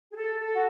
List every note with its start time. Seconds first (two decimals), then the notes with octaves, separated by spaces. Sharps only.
0.12 G#4
0.16 A4
0.39 A4
0.53 F#4